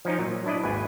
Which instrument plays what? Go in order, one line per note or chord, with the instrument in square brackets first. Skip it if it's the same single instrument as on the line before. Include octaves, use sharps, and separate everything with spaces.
[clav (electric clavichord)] F3 C#4 D#4
A#2 F#3
D4 E4 D5 D#5
G#1 D#2 B4 G#5